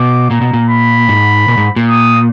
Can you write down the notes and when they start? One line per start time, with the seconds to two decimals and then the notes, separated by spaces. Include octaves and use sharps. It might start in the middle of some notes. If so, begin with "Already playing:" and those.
Already playing: B2 D6
0.31 A#2 A#5
0.41 B2
0.53 A#2
0.69 B5
1.09 G#2
1.48 A#2
1.57 G#2
1.76 A#2
1.87 D#6